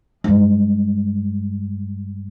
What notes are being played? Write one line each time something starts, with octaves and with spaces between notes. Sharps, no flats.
G2 G#3